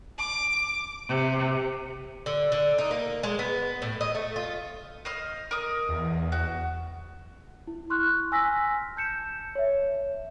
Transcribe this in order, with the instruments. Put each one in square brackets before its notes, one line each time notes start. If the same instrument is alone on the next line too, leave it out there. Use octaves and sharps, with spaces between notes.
[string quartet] D6
C3
[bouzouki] D3
D3
D#4
A#3
G#3
B3
A2
D#5
A3
F4
[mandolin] C5 D#5 F6
A#4 D#5 D#6
[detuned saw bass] E2
[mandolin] F#4
[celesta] E4
C6 C#6 F6 F#6
G#5 E6 F6 A#6 B6
A5 G6 C#7 E7
C#5 E5